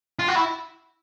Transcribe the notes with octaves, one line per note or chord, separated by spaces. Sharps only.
F4
F#4
E4